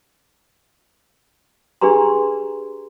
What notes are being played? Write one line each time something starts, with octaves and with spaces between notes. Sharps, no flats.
D4 G4 G#4 B4 A#5 C6